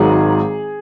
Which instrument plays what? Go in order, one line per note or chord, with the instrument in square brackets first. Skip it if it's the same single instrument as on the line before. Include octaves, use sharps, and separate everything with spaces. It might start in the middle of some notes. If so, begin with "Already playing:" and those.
Already playing: [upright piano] G#1 G#2 D#3 F#3 G#4